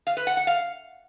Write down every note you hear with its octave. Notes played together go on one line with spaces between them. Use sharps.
F5
B4
F#5
F#5
F5